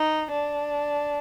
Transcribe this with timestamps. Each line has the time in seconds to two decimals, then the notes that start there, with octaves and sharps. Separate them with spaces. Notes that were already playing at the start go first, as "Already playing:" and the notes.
Already playing: D#4
0.31 D4